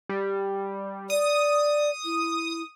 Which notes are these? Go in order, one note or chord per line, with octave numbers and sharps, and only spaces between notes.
G3
D5 D#6
E4